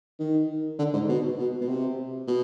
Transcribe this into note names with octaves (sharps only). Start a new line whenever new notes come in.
D#3
D3
G#2
B2
B2
B2
C3
B2